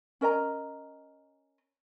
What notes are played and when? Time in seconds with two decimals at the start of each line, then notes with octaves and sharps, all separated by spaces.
0.21 C#4 A#4 D#5 A#5